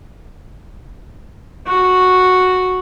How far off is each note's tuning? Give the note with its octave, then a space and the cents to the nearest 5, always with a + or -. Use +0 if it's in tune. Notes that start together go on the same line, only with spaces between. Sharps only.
F#4 -5